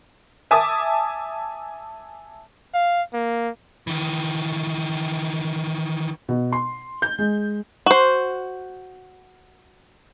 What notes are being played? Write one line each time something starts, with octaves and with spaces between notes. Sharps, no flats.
E5 G#5 A5 D6 D#6
F5
A#3
D#3 E3
B2
C6
G6
G#3
F#4 C5